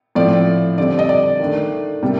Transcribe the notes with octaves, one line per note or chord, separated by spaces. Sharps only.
A2 F3 C4 D5
D3 G3 C4 D5
D#5
D5
D#3 A3 D4
C3 G3 A#3